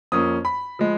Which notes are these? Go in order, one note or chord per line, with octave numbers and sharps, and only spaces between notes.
F2 F3 A#3 C#4 D#6
B5
F3 G#3